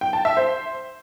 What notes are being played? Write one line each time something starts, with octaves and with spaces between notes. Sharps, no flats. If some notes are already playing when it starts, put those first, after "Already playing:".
G5
A5
E5
C5